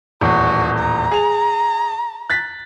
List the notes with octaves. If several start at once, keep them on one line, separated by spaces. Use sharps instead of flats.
D#1 E2 A2 F#4
A#5
G#4 F7
F#6 A6 B6